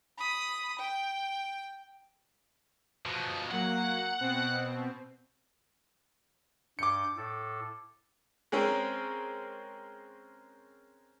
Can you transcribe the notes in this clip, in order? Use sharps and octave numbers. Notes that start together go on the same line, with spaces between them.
B5 D#6
G5
B2 F3
F#3 A#3 F#5
B2 C4
G2 D6 G6 C#7
A2 A4
G#3 C4 C#4 A#4 C5